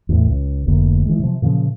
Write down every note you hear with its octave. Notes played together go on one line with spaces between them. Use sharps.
E2 A2
C#2
F1 D2 A#3
E3 G#3
C3 F3
A#2 C#3 E3 F3